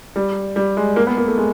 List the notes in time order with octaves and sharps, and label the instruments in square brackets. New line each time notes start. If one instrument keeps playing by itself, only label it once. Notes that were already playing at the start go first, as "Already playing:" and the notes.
[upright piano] G3
G3
G#3
A#3
B3
A#3
A3
G#3